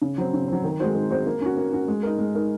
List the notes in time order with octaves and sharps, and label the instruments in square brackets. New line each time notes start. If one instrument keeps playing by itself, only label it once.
[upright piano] C#3
F#3 C4
C#3
F#3 C4
D#3
G#3 C4 F#4 C5
D#3
G#3 C4 F#4 C5
A#3
C#4 F#4
A#3
C#4 F#4
G#3
D#4 A#4
G#3
D#4 A#4